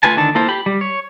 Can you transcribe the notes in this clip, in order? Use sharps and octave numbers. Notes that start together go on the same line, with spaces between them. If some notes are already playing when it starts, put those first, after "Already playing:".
A3 F4 B4 G#5 A5
D3 D#3 A5
A#3 E4 F4 A4 C5
G4 B5
G3
C#5